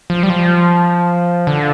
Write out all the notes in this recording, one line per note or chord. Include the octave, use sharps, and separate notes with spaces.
F3
G3
F3
D3